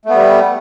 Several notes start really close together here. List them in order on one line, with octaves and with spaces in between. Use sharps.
A3 B3 G3